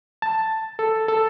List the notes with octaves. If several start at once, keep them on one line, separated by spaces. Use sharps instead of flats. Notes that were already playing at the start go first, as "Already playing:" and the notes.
A5
A4
A4